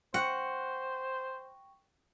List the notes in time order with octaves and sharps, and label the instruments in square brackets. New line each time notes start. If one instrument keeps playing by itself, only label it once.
[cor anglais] C5 [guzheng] F#5 [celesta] G5 C#6 A#6